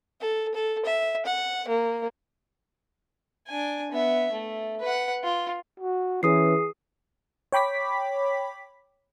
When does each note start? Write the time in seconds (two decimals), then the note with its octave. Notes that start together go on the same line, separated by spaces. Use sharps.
0.21 A4
0.54 A4
0.85 E5
1.25 F#5
1.68 A#3
3.47 D4 G#5
3.92 B3 E5
4.32 A3
4.81 B4 F#5
5.24 F4
5.80 F#4
6.23 E3 C#4 G#4 D#6 C7
7.52 C#5 G5 B5 D6 B6